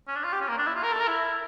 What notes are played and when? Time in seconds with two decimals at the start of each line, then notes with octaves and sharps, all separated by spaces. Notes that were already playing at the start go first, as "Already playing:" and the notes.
0.08 C#4
0.16 D4
0.24 F4
0.32 G4
0.41 C#4
0.49 A#3
0.58 D4
0.67 E4
0.75 F4
0.83 A#4
0.92 A4
1.00 A#4
1.08 E4